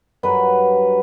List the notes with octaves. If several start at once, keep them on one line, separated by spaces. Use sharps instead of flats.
G2 F#3 B4